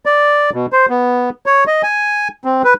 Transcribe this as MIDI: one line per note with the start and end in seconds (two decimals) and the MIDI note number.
0.06 0.50 74
0.54 0.66 47
0.72 0.86 72
0.89 1.30 59
1.46 1.64 73
1.67 1.82 75
1.83 2.28 80
2.44 2.62 60
2.64 2.74 71